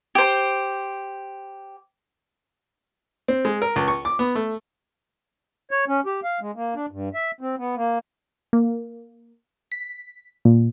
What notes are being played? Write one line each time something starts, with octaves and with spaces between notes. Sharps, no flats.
G4 C5
C4
G#3
A#4
C#2
C#6
D6
B3
A3
C#5
C#4
G4
F5
G#3
A#3
D4
G2
E5
C4
B3
A#3
A#3
B6
A#2